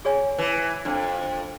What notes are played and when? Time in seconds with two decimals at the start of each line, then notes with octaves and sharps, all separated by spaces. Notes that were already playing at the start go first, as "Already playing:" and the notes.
0.05 G#4 C#5 G#5
0.38 E3
0.85 F2 D4